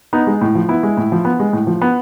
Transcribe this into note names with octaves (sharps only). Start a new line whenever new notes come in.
B3 D#4
G#3
A2
F3
B3 E4
G#3
A2
F3
B3
G#3
A2
F3
B3